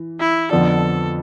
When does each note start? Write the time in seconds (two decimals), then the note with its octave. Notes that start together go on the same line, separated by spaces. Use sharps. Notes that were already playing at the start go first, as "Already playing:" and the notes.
Already playing: E3
0.20 E4
0.51 F2 D3 F3 B3 D4 A4